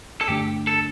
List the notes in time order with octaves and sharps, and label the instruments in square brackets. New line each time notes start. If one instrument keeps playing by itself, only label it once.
[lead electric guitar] A4
[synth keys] G2 D3 A3 D4 [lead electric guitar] G4
[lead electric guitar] A4